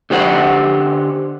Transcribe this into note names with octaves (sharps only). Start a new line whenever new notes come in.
D3 G4 C5 F#5